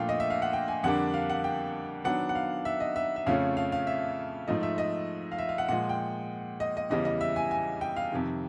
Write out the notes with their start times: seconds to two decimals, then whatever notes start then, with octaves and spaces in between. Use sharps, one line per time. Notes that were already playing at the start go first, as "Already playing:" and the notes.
Already playing: A#2 F3 A3 D4 F5 G5
0.09 D#5
0.20 E5
0.30 F5
0.42 F#5
0.53 G5
0.68 G#5
0.83 F2 D3 G3 A#3 D4 F#5
1.14 F5
1.30 F#5
1.44 G5
2.04 D#3 F#3 B3 D4 F#5
2.29 F#5
2.35 F5
2.65 E5
2.80 D#5
2.96 E5
3.16 E5
3.26 F2 C#3 F3 A3 C#4 F5
3.57 F5
3.72 F5
3.87 E5
4.48 G#2 F3 A3 D#5
4.63 E5
4.78 D#5
5.32 F5
5.38 E5
5.49 F5
5.58 F#5
5.69 A#2 F3 G#3 F#5
5.89 G5
6.60 D#5
6.77 D#5
6.90 E2 C#3 E3 G3 D#5
7.05 D#5
7.21 E5
7.36 G#5
7.51 G#5
7.81 G5
7.96 F5
8.12 F2 C3 D#3